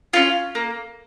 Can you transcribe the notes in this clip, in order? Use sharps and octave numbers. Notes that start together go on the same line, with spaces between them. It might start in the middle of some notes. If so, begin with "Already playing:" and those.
C#4 F4
A#3